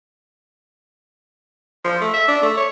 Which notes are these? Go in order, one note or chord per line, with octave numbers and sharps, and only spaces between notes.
F3
A3
E5
D4
A3
C#5